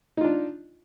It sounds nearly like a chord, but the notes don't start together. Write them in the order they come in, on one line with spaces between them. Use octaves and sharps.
D#4 F4 D4